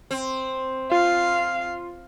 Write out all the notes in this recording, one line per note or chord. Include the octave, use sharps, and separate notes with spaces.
C4
F4 F5